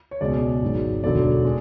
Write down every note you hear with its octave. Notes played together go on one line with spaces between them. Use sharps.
C#5
C#2 B2 G#3 D5
G#1 G#2 F#3
E1 D2 D3 F#3 D5
G#3